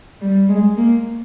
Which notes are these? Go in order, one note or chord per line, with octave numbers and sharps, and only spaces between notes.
G3
G#3
A#3